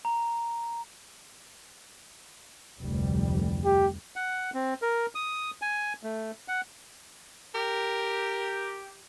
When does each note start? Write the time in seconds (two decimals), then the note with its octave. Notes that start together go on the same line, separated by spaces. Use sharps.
0.05 A#5
2.79 F1 D2 G3
3.65 G4
4.16 F#5
4.54 C4
4.82 A#4
5.15 D#6
5.62 G#5
6.03 A3
6.48 F#5
7.54 G4 A#4